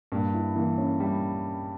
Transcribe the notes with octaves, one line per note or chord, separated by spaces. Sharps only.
G2 A#3
E4
E3 A#3
C#4
G3 E4